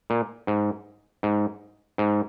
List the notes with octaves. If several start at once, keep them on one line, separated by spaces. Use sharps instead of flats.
A#2
G#2
G#2
G#2